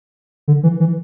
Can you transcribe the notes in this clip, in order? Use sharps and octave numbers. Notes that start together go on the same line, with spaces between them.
D3
E3
E3